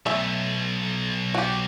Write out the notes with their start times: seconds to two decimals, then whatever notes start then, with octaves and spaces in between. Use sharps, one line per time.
0.06 B1 A3 E5
1.34 F#4 G4